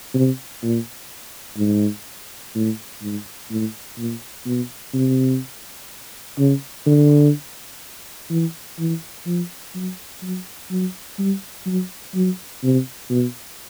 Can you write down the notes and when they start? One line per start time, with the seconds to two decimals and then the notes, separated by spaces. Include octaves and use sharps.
0.14 C3
0.63 A#2
1.58 G#2
2.55 A2
3.02 G#2
3.50 A2
3.98 A#2
4.46 B2
4.94 C3
6.38 C#3
6.86 D3
8.30 E3
8.79 E3
9.26 F3
9.75 F#3
10.23 F#3
10.71 F#3
11.19 G3
11.66 F#3
12.15 F#3
12.63 C3
13.10 B2